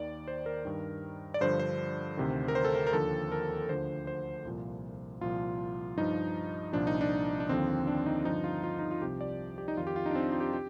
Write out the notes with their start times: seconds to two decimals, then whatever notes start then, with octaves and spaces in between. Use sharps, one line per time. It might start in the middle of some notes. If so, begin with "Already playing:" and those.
Already playing: D#2 D#3 D5
0.28 C5
0.46 A#4
0.65 G2 D#3
1.34 D5
1.41 G2 D3 F3 C5
1.59 C5
2.17 D2 C3 D#3
2.48 A#4
2.55 C5
2.65 A4
2.75 A#4
2.87 A#4
2.93 D#2 D3 F3 A4
3.32 A#4
3.69 D2 D3 F3 C5
4.07 C5
4.45 C2 A#2 F3
5.21 C2 A#2 F3 F4
5.97 G2 F3 D#4
6.73 C2 A#2 F3 D4
6.87 D#4
7.01 D4
7.40 D4
7.49 D#2 D3 F3 C4
7.87 D4
8.06 D#4
8.25 G2 D3 F3 D#4
8.44 F4
8.63 F4
8.79 D#4
8.91 F4
9.01 C2 C3 F3 G4
9.21 D5
9.58 G4
9.68 D#4
9.77 F2 D#3 F4
9.87 G4
9.96 F4
10.06 D#4
10.11 D4
10.15 C4
10.32 F4
10.40 G4
10.53 G4